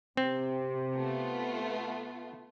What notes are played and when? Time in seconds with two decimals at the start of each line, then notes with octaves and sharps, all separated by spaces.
0.17 C3 C4
0.96 A3 B3 F4